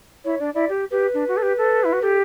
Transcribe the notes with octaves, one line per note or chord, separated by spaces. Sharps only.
E4 C#5
D4 D5
E4 D5
G4
G4 B4
D4
F#4
A4
G4
A4
E4
F#4
G4 A4